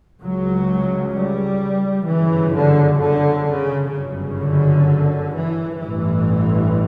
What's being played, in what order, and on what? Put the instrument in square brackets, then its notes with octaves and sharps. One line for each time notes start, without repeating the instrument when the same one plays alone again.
[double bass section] C#2 C#3 F#3
G3
G1 F#2 C#3 E3
D3
D3
C#3
G1 F#2 C#3
D3
E3
A1 G2 E3